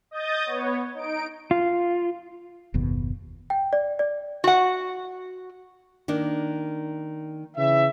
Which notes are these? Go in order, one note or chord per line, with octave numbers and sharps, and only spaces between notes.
D#5 D#6 G6 A6
B3 C#5
D#4 D7
F4
F#1 D#2 B2
G5
D5
D5
F#4 F#5
D#3 A#3 D4
C#3 E3 E5